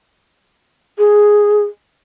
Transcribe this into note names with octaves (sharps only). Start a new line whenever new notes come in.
G#4